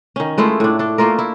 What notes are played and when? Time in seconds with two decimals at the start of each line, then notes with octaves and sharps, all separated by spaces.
0.16 D#3 C#4
0.38 G#3 A3 E4 F4
0.60 A2 D4
0.79 D4 A4
0.98 A3 A#3 F4 A#4
1.19 E4